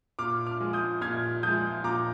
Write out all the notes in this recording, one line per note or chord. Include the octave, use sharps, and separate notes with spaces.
A#2 D6 F6
D6 F6
F3 G#3
D#6 G6
A#2 F6 G#6
F3 G#3 D#6 G6
A#2 A#5 D6